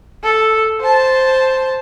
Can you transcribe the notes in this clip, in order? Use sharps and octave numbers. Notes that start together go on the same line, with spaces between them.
A4
C5 A5